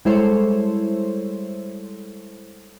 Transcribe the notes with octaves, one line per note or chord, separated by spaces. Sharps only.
G3 G#3 E4 A4 C5 C#5